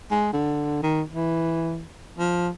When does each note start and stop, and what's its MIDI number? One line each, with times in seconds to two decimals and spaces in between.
0.11 0.28 56
0.33 0.79 50
0.83 1.02 51
1.12 1.82 52
2.18 2.49 53